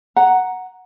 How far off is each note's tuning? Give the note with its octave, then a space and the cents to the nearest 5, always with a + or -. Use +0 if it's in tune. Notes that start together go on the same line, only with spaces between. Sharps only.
F#5 +0 A#5 +0